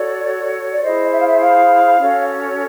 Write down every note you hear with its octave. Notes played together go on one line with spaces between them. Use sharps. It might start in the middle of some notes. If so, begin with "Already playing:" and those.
Already playing: F#4 A4 C#5 D5
D5
E4 G#4 C5 D#5
E5
F5
E5
F5
C#4 F#4 A4 C#5